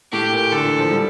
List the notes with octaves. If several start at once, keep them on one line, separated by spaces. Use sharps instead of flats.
A2 G4
A#2
D3 A4
E3
F3
G3